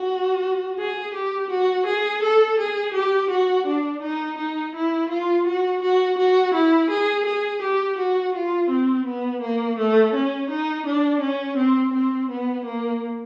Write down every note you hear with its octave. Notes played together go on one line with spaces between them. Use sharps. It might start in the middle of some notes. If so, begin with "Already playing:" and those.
Already playing: F#4
G#4
G4
F#4
G#4
A4
G#4
G4
F#4
D4
D#4
D#4
E4
F4
F#4
F#4
F#4
E4
G#4
G#4
G4
F#4
F4
C4
B3
A#3
A3
C#4
D#4
D4
C#4
C4
C4
B3
A#3